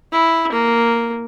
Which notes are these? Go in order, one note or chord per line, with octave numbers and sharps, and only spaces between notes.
E4
A#3